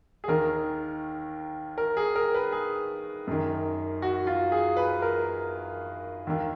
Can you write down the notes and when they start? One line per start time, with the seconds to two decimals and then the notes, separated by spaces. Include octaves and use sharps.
0.24 G#4
0.28 D#2 D#3 A#4
1.78 A#4
1.97 G#4
2.15 A#4
2.34 B4
2.52 G#4
3.27 F#2 D#3
4.02 F#4
4.27 F4
4.52 G#4
4.77 B4
5.02 A#4
6.27 D#2 D#3